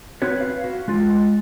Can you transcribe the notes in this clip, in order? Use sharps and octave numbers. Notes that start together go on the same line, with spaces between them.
C4 F#4 B4 C#5
B4 F5
F#4
G#3 F4